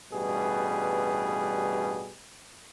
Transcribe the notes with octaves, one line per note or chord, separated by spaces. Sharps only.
A1 G2 B2 G3 G#4 B4